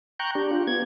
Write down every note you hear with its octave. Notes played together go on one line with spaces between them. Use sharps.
G5 A#5 C#6 F#6 G6
D4 G4
F4
B3 G#6